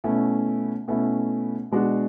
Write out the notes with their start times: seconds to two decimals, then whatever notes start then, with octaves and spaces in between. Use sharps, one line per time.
0.04 B2 A3 C#4 E4
0.88 B2 A3 C#4 E4
1.71 B2 G#3 D4 F#4